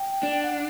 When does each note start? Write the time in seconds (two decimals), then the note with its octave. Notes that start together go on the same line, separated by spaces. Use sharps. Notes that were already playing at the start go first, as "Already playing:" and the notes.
Already playing: G5
0.23 D4
0.32 G5
0.43 F#5